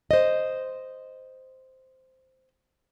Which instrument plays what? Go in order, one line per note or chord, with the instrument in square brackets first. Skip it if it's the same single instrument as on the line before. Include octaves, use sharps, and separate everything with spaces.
[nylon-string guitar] C5 D#5